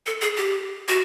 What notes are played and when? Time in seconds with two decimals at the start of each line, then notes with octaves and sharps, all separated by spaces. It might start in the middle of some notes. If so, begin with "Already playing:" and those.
0.06 A4
0.21 G#4
0.37 G4
0.88 F#4